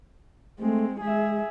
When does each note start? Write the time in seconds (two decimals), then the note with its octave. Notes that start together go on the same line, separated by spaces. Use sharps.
0.60 G#3 A3 C4
1.00 G#3 G#4 E5